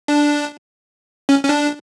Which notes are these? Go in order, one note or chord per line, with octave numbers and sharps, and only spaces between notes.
D4
C#4
C#4
D4